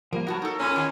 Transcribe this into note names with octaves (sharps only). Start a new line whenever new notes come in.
F3 G3 A#3 A#4
B3 F#4 A#4 C#5 A5
D#4 A4
E2 A#2 C#4
D#3 G#5